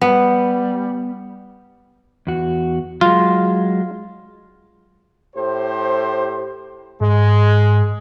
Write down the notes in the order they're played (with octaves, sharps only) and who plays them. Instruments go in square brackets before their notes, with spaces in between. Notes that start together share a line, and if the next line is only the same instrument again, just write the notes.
[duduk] G3 [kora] B3
[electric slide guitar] E2 F#4
[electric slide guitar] F#3 G#3 [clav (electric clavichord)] F4
[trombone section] A2 G4 C5
[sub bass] G#2 [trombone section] G#3